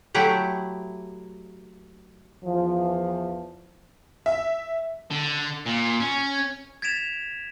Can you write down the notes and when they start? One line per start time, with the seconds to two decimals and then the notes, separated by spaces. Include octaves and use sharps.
0.15 F#3 A3 E4 G4 F#5
2.44 E2 E3 F3
4.26 E5
5.11 D3
5.66 A#2
6.00 C#4
6.82 G#6 A6 B6 D7 E7 F7